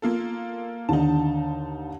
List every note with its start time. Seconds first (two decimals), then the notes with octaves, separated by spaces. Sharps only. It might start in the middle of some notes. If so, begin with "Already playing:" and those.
0.02 A#3 F4 A4
0.89 D#2 D3 D#4 A5